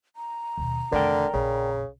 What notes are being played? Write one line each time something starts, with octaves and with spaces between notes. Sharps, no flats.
A#5
D#2 B2
F1 D3 D#3 A#4 D5 G5
A#1 F2 C#3